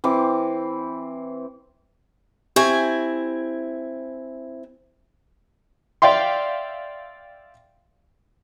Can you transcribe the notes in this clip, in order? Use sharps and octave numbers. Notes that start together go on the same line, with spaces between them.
E3 C4 D6
C4 E4 G4 G#5
D5 E5 F5 G5 C6